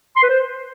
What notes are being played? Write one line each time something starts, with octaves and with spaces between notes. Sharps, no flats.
C6
B4
C5